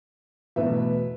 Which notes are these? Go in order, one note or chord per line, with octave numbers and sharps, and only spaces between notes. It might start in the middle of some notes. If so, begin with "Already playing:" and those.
E2 B2 A3 B4 E5